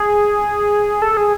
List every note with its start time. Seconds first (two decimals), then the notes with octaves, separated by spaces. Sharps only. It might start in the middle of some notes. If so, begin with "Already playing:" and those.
Already playing: G#4
1.02 A4
1.17 G#4